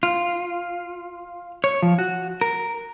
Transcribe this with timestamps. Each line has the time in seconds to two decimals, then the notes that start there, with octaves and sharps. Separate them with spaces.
0.03 F4
1.64 C#5
1.82 F3
1.99 F#4
2.41 A#4